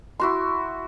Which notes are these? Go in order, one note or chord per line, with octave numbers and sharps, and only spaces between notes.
E4 F#4 C6